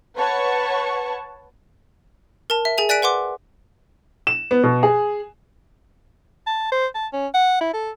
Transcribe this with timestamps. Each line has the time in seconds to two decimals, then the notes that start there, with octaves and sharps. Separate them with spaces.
0.17 B4 C#5 F#5 A5 C#6
2.50 A#4 A5
2.65 E5
2.78 G#4 G#5 F7
2.89 D5 G#5 F#6 B6 D7
3.02 B4 F#5 C6 D6
4.27 E7
4.51 B3
4.63 B2
4.83 G#4
6.47 A5
6.72 C5
6.95 A5
7.13 C#4
7.34 F#5
7.61 E4
7.74 A4